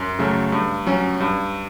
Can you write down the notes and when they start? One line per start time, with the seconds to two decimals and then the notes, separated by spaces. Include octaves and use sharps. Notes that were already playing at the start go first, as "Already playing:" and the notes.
Already playing: F#2
0.19 C#3 F#3 A3
0.52 G2
0.87 F#3 C#4
1.20 G2